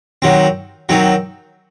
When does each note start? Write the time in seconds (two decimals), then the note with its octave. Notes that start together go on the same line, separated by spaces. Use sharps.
0.22 D#3 F#3 C4
0.89 D#3 F#3 C4